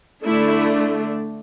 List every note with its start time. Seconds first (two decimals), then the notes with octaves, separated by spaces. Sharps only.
0.24 D3 A3 D4 E4